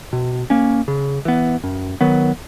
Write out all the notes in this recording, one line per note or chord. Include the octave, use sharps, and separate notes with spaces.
B2
A#3 C#4
C#3
E3 B3
F#2
D#3 F#3 B3